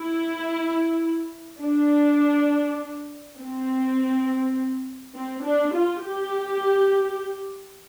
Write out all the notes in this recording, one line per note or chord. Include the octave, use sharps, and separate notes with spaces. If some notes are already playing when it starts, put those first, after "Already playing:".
Already playing: E4
D4
C4
C4
D4
F4
G4